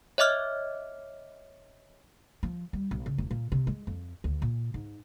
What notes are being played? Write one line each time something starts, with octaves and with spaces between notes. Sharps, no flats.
C#5 D#5 E5 D6 F6
F3
G3
B1
C#3
E1
A#2
C3
G#3
F2
D2
A#2
G#2